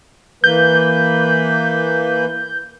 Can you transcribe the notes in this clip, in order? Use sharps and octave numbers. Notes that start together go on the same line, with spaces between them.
E3 A#3 B4 G6